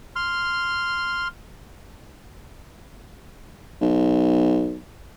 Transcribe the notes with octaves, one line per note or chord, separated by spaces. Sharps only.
C6 F6
B1